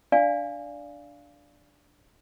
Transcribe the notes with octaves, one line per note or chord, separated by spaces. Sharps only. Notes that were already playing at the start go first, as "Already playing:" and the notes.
D4 D5 F5 G#5